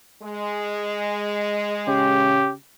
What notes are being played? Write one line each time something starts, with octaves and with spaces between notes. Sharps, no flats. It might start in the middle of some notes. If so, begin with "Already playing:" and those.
G#3
C#3 G4